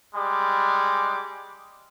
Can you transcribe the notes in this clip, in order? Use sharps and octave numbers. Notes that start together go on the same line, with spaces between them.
G3 G#3 D6